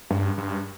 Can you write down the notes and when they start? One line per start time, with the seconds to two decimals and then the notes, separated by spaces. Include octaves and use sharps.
0.10 G2
0.38 G2